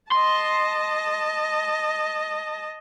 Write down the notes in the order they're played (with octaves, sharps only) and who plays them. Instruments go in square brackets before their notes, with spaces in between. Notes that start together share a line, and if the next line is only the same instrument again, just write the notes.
[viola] D#5 A5 [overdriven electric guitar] C6